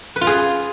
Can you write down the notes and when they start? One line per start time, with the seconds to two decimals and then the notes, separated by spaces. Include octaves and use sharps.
0.16 B4
0.21 F4
0.27 G#4